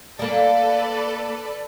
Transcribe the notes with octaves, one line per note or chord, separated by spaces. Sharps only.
A#3 D4 A4 B4 D5